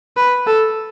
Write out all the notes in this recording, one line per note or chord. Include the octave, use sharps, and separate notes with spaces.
B4
A4